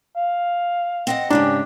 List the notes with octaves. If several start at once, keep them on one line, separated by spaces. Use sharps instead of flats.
F5
C4 D#5 F#5
G#2 C#3 C#4 D4 G4